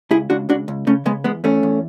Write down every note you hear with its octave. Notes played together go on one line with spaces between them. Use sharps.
C#2 E4 G#4
C#2 D4 F#4
C#2 D4 F#4
C#2
C#3 A3 C#4
C#3 G#3 B3
E2 G#3 B3
E2 A3 C#4
E2